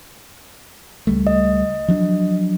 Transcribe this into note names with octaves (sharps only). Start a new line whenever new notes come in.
C#2 G3 A3
D#5
F3 F#3 D4